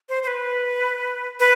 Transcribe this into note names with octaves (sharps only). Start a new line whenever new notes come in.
C5
C5
B4
B4